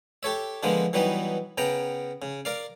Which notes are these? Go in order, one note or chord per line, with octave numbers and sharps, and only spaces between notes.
G4 A4 C#5 E5
D3 F3 G#3 A#3 B3
E3 F#3 G3 B3 D#4
C#3 B3 G5 A#5
C#3
A#4 D5 F5